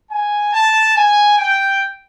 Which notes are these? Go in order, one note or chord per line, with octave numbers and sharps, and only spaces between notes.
G#5
A5
G#5
G5